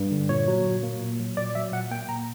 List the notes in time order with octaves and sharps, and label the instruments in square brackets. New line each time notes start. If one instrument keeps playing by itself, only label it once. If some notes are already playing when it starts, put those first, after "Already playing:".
Already playing: [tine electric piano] G2
D3
A#2 C#5
F#3
A#2
A#3
A#2
F#3
A#2 D5
F#3 E5
A#2 F#5
A#3 G5
A#2 A#5